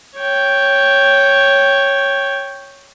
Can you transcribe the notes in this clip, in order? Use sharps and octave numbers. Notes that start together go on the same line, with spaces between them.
C#5 G5